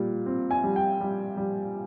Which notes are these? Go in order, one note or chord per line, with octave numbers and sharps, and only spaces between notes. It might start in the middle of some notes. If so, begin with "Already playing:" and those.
Already playing: A#2 G3
C4
G#5
G3
G5
G3
G3